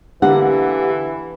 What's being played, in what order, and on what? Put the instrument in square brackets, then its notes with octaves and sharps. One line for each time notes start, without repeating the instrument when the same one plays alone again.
[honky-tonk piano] D3 [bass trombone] E3 [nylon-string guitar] A#3 F#5 [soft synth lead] G4